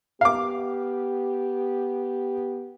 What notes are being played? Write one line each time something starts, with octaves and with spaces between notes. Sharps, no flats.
B3 G4 F5 D6